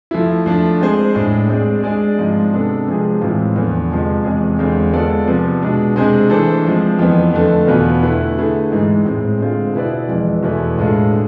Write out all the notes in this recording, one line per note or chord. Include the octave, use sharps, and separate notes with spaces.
F3 A3 E4
F3 A3 D4
G#3 C4 G#4 C5
A2 G#3 D4
G#3 C4 G#4 D5
G#3 D4 G#4 D5
G#2 F3 G#3 C4 F4
C3 G#3 B3 D4 A4
C3 F3 G#3 C4 G#4
A2 E3 G#3 C4 F4
E2 D3 F3 B3
F2 C3 F3 G#3
E2 C3 G#3 C4 G#4
E2 D3 G#3 C4 F4
G#3 B3 F4 A4 D5
C3 F3 B3
B2 G#3 D4
C3 G#3 D4 G#4 C5
E3 A3 D4 A4 C5
F3 G#3 C4
F2 E3 B3
F2 D3 A3
E2 B2 B3 F4 B4
D3 A3 E4 B4
D3 A3 E4 G#4
G#2 E3 G#3
A2 G#3 C4
D3 G#3 C4 F4
B2 B3 E4 B4 D5
F2 E3 G#3
E2 B2 A3 E4 B4
A2 G#3 D4 F4 A4
D3